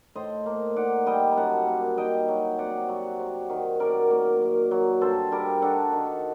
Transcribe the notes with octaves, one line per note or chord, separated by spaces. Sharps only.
A2 C5 D#5
A#3
D#4 D5 F#5
G3 D#5 G5
A#5
F#2 F#5 A5
A#3
D#4 D#5 G5
F#3
C3 D5 F#5
F#3
C3
D#3
F#2 A#4 D5
A#3
F#2
F#3
G2 A4 C5
G3 G4 A#4
D4 F#4 A4
D#3